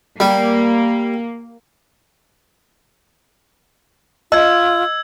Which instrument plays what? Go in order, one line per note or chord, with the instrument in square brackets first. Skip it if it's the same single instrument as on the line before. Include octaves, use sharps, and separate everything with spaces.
[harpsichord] G3 [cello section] A#3
[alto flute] F4 [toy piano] D#5 [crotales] E6 G#6